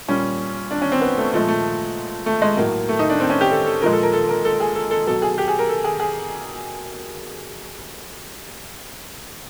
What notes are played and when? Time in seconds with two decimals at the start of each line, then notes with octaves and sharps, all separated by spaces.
0.08 A#2 G3 C#4
0.71 D4
0.82 C#4
0.92 C4
1.01 B3
1.18 A3
1.33 A#2 F3 G#3 A3
1.48 A3
2.26 A3
2.42 G#3
2.57 A2 F#3 A#3
2.89 A3
2.99 D#4
3.10 D4
3.20 C4
3.30 C#4
3.41 G4
3.51 A4
3.66 A4
3.82 A#2 F3 G#3 A#4
3.93 A4
4.03 A#4
4.13 A4
4.29 A#4
4.45 A4
4.60 G#4
4.75 A4
4.91 A4
5.07 B2 F#3 A4
5.22 G#4
5.38 G4
5.48 G#4
5.59 A#4
5.69 A4
5.84 G#4
6.00 G#4